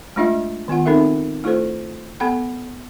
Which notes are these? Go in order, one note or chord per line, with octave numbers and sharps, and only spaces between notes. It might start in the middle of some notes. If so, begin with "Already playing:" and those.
G#3 A3 D4 F4 D#5 E5
D#3 B3 F4 F#5
C4 D#4 A4 A#4 E5
A3 E4 F4 A4 C5
B3 A4 F#5 G5 B5